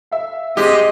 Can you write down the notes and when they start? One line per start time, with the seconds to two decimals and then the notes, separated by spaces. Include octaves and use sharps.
0.11 E5 F5
0.57 G#3 C4 G4 C5 D#5